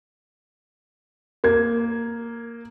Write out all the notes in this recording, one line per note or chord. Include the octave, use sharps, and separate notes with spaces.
A#3 G#6